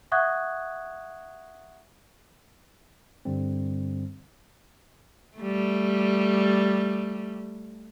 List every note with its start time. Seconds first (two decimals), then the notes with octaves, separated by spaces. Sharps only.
0.12 E5 F#5 C#6 D#6 F#6 G#6
3.25 G2 D3 G3 C4
5.37 G3 A3